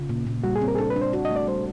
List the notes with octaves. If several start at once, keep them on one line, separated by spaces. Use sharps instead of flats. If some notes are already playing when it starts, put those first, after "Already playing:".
Already playing: C#3 F4
A#2
A#2
G3 F#4
G#4
C4
A#4
G#4
D4 A4
B4
D4
C5
F#4
D#5
A3
D5
G3 C5